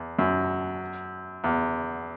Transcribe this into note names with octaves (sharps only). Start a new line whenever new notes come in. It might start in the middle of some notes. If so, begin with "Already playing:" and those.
Already playing: E2
F#2
E2